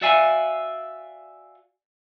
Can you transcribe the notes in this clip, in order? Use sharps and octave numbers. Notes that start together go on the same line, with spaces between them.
F#4 D5 E5 F5 G#5